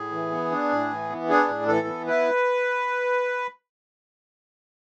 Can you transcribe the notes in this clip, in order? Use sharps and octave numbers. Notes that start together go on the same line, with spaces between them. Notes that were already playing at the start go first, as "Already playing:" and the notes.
Already playing: A2 G#4
E3
B3
D4
A2
E3
B3
D4 G#4
A2
E3 A4
B3
E4 B4